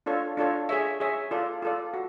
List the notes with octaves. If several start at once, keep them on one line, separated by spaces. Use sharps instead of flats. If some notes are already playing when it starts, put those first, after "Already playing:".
D4 F4 A4 C#5
D4 F4 A4 C#5
G#4 C#5 E5
G#4 C#5 E5
F4 A4 D5
F4 A4 D5
F#4